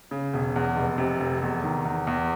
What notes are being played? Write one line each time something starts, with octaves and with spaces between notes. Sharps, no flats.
C#3
E1
E2
F1
C3
F1
E2
D#3
E2
E2